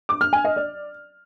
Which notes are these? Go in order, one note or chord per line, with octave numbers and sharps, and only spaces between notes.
D6
F6
G#5
D#5
D5